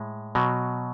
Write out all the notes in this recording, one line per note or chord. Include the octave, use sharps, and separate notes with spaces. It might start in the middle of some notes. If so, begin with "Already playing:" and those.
Already playing: A2 G#3
B2 F#3